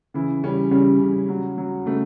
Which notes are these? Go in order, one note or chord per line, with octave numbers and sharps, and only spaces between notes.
C#3 E3 E4
C#3 G3 C#4
C#3 G3 C#4
C#3
F#3
F#3
C#3 A3